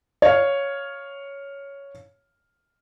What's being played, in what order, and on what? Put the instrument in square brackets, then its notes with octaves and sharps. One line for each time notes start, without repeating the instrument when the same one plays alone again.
[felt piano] C#5 F5